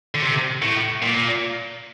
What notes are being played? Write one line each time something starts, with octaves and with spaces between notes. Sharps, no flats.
D3
C3
A2
A#2